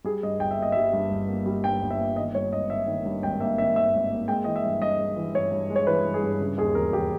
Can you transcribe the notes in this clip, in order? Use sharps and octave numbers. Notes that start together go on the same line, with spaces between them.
G3 G#4
G2 D#5
G1 G5
E5
A#3 D#5
G3 E5
G2
G1
A#3
G3
G2 G5
G1
E5
A#3
D#3 D#5
G2 C#5
G#1 D#5
A#3 E5
D#3
G2
G#1 G5
A#3 E5
D#3 E5
G2 E5
G#1
A#3
G#3 G5
E3 D#5
E5
G2
G2 D#5
G#3
E3
G2 C#5
G2
G#3
C#5
E3 B4
G2
G#4
G2
C#3
D#2 G#4
E1 A#4
E1 G4